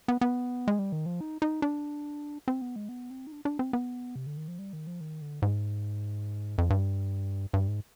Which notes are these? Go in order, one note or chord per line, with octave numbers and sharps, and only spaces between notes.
B3
B3
G#3
G3
D#3
F3
D#4
D#4
D4
C4
B3
G#3
B3
C4
D#4
D4
D4
C4
B3
C3
D3
D#3
F3
G3
D#3
F3
D#3
D3
G#2
F2
G2
G2
G#2